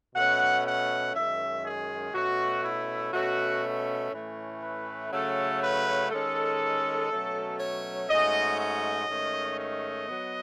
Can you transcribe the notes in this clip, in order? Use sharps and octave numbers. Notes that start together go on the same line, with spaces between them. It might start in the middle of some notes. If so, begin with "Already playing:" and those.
B2 A3 C#4 F#5
F#5
F#2 D#3 G#3 C#4 E5
G#4
B2 A3 C#4 F#4
E4
B2 A3 C#4 F#4
A2 E3 A3 C#4
B4
C#3 F#3 A3 C#4 A4
B4
D#3 G#3 C#4 A4
B2 F#3 A3 C#4
C#5
G#2 F#3 A3 C#4 D#5
D#5
G#2 D#3 A3 C#4
D#5
F#3 B3